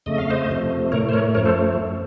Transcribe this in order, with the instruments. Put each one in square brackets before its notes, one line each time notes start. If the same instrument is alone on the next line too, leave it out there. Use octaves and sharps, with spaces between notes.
[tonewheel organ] F2 C#3 A3 D#5
F5
C5 D#5
F2 C3 F3 A3
A2 A3 A#4 C#5
C5
A#4 C#5
F#2 F3 A3 A#4 C#5
A4 C5